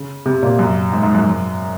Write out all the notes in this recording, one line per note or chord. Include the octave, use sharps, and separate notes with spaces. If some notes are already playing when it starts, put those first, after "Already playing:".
Already playing: C#3
C3
A#2
F#2
G#2
G#2
F#2
F#2